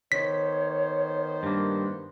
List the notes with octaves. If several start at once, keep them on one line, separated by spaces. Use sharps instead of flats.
D#3 B3 C5 C#5 B6
G2 A#3